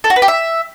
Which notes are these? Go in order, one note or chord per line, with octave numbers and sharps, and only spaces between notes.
A4
F#4
B4
G4
E5